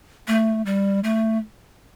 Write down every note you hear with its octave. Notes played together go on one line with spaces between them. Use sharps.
A3
G3
A3